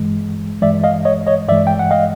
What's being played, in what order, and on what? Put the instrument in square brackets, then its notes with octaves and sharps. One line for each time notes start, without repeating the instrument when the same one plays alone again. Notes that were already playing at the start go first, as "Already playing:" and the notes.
Already playing: [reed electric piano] G2 E3 G#3
G2 E3 G#3 D5 E5
D#5 F5
C#5 D#5
C#5 D#5
G2 E3 G#3 D5 E5
G5
F#5
D#5 F5